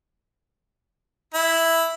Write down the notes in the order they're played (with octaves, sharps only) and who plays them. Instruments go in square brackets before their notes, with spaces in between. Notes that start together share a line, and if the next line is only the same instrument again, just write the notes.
[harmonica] E4